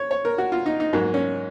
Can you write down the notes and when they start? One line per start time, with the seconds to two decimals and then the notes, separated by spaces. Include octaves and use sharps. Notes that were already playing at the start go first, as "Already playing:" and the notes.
Already playing: C#5
0.11 C#5
0.25 A#4
0.38 F#4
0.52 F4
0.66 D#4
0.80 D#4
0.93 G#2 F#3 A#3
1.14 C#4